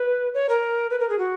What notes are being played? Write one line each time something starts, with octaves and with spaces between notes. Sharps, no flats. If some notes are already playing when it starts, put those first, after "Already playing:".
Already playing: B4
C#5
A#4
B4
A#4
G#4
F#4